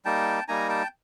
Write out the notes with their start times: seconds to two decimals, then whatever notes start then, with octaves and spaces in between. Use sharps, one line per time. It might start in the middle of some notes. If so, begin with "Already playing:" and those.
0.05 G3 A#3 D#4 G5 A5
0.48 G3 A#3 D#4 G#5 A#5
0.69 G5 A5